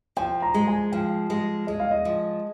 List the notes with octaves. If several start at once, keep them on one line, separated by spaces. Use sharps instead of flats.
F3 G5
A#5
G#3
G#5
F3 G5
G#3
G#3 D#5
F5
D#5
F3